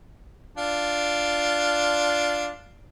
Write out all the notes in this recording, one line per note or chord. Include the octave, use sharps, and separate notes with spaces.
D4 F4